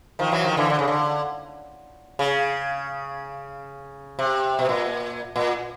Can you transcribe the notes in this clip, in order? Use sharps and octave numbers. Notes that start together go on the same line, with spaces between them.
D#3 F3
E3 F#3
D#3 F3
D3 E3
D3
C#3
D3
C#3
C3
B2
A#2
A#2